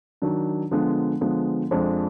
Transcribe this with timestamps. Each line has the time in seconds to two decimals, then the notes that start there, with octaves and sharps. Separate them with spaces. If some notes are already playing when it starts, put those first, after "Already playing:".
0.22 D#3 F#3 D4
0.71 D3 F3 G#3 B3
1.21 D3 F3 G#3 B3
1.71 F2 F3 G#3 D4